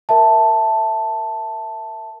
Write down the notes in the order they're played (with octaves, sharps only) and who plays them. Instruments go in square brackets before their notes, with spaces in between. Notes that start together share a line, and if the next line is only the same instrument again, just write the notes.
[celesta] A#4 E5 A5